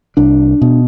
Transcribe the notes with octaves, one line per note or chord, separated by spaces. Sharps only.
C2 D4
B2